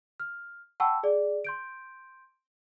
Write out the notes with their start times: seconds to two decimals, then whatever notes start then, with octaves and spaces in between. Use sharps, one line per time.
0.20 F6
0.80 F#5 G5 A5 B5 C#6 E6
1.03 G#4 D5
1.44 C6 G6 D7